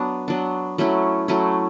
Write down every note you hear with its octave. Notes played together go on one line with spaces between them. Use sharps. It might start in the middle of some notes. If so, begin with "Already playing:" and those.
Already playing: F#3 B3 D4
F#3 B3 D4
F#3 A3 C#4 E4
F#3 A3 C#4 E4